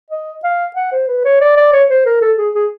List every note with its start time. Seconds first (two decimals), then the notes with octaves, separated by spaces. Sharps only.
0.10 D#5
0.44 F5
0.76 F#5
0.92 C5
1.08 B4
1.25 C#5
1.41 D5
1.57 D5
1.73 C#5
1.89 C5
2.05 A#4
2.21 A4
2.38 G#4
2.54 G#4